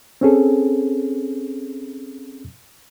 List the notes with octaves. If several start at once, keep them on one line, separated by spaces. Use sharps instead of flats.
C4 C#4 G#4 A4